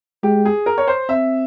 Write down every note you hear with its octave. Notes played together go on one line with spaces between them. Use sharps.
G#3 G4
G#4
A#4
C#5
C5
C4 E5